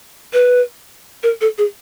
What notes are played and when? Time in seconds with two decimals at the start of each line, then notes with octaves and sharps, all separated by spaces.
0.33 B4
1.23 A#4
1.41 A4
1.58 G#4